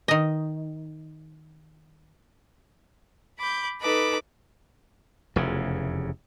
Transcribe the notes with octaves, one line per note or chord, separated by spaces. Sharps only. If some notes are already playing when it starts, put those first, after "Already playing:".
D#3 D#5
B5 D6 G6
D#4 A4 B4 B5 D6
F1 E2 C#3